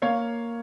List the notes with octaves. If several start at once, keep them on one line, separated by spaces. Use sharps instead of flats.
A#3 C#5 F5